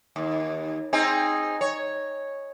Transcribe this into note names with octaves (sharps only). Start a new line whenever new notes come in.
D#2
C4 D#4 G#4
C#5